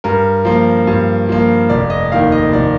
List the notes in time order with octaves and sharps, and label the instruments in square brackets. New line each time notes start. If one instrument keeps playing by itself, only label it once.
[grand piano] G2 A#4
F3 A#3
G2
F3 A#3
F1 D5
D#5
D#2 D#3 F5
D#5
F1 D5